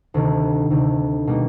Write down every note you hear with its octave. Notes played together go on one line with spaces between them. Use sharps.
D2 C3 D#3
D2 C3 D#3
B2 G3 A#3 D#4